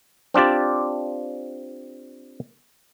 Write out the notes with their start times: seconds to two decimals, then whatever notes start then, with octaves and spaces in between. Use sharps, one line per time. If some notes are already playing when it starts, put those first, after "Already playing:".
0.34 C4 D4 F4 G4 D5